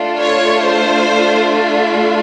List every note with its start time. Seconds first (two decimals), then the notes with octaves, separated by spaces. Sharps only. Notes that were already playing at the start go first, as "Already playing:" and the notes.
Already playing: A3 D4 F4
0.19 C#5
0.63 C5